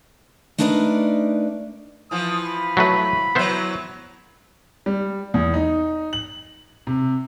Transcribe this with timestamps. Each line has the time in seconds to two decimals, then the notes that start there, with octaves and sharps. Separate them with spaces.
0.58 A3 D4 D#4 A#4 B4 D5
2.11 E3 F3 D#6
2.45 B5
2.77 F#3 A3 B4
3.35 E3 F#3 B3 C5 E5
4.86 G3
5.34 E2
5.54 D#4
6.13 F#7
6.87 C3